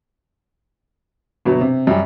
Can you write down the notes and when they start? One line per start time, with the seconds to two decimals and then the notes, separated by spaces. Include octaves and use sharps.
1.45 G1 B2 F#3
1.61 C3
1.87 F#2 G3